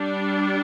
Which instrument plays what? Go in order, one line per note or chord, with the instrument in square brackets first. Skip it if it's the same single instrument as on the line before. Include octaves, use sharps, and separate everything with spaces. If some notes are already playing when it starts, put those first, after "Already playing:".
Already playing: [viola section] G3 D4